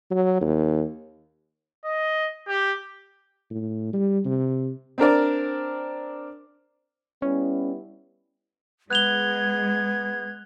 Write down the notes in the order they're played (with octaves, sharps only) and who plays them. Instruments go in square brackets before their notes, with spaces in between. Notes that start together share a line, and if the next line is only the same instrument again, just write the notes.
[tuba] F#3
D#2
[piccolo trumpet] D#5
G4
[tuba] A2
G3
C3
[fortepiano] C4 D4 A#4 D5
[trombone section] G3 B3 E4 [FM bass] C#4
[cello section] G#3 [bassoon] B3 [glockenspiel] F#6 F7 G7 [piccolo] G#6